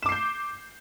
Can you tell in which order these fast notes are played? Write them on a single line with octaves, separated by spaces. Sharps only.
E7 D6 C7 G6